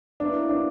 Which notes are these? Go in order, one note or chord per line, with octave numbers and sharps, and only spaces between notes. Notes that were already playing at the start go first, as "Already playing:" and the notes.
B2 F#3 A#3 D4 E4
D4